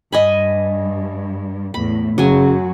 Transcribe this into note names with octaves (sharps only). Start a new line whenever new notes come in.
G2 D#5 G#5 B5
E2 A2 B5
F#2 C#3 F#3 F#4 G#5